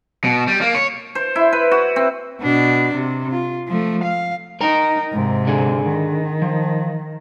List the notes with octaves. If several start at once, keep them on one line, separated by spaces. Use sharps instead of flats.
B2
G3
A#3
C#5
C5
E4
B4
F#4
C4
B2 D4
C3
F4
F3 A3
F5
D#4 A#4 G5 A#5
G#2 C3
D3 G#4
D#3
F3